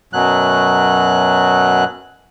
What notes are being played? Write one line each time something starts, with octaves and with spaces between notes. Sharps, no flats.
F#2 B2 F#3 F#6